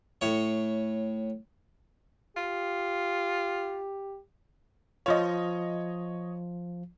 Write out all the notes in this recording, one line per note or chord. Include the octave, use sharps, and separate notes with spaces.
A2 C#5
F4 G4
F3 F4 C#5 D#5